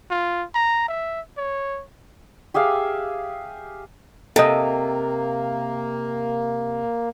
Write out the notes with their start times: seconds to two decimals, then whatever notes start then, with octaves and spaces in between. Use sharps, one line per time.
0.11 F4
0.55 A#5
0.88 E5
1.37 C#5
2.54 G4 G#4 E5 F5
4.36 C3 A#3 A4 D#5